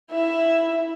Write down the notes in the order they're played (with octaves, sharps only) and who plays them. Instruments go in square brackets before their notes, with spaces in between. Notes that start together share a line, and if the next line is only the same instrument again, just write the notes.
[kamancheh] E4 E5